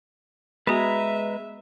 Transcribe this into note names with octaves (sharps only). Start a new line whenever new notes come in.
G#3 B3 F#4 B4 E5 A#5